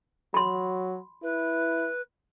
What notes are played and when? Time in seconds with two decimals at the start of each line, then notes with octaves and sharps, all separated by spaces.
0.34 F#3 B5 C6
1.23 E4 B4